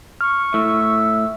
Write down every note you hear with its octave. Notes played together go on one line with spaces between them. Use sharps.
C#6 F6
A2 E5